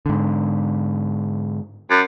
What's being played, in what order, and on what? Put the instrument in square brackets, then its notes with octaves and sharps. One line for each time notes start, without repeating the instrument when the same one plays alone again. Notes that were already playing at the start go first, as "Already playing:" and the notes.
[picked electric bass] G#2 D3
[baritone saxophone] F#2